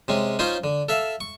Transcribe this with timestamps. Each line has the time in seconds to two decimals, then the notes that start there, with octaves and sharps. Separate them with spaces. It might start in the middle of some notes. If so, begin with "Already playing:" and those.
0.08 C3 G#3 C#4
0.39 C#4 D#4 F4 C5 C#5
0.64 D3
0.89 A4 E5 F5
1.20 C#6